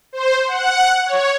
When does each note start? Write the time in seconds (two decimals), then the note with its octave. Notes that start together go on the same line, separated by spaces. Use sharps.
0.13 C5
0.46 F#5
1.06 C#5